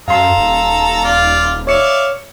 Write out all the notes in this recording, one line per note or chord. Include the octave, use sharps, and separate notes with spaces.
F#2 A4 F5 A#5 C6
D#1
F4 D5
C#5 D5 E5 F5 C#7